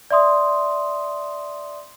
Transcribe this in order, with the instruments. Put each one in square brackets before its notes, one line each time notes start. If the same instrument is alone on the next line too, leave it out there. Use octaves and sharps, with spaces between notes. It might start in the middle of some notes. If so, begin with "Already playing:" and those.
[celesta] D5 E5 C6 D#6